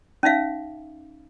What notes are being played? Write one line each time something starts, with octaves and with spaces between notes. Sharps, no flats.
C#4 D#4 E5 F5